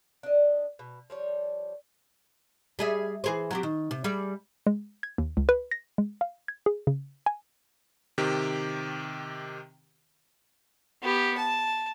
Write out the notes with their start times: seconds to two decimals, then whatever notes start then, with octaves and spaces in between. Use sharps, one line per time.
0.23 D4 D#5
0.79 B2
1.10 F3 G3 C#5
2.79 G3 G#4 E5
3.24 E3 G#4 C5
3.51 F#3 C4 G4
3.63 D#3
3.91 C3
4.04 G3 G#4 D5
4.67 G#3
5.03 G#6
5.18 D#2
5.37 C#2
5.49 B4
5.71 A#6
5.98 G#3
6.21 F5
6.48 G#6
6.66 G#4
6.87 C#3
7.26 G#5
8.18 C3 D#3 G4
11.03 B3 G4
11.37 A5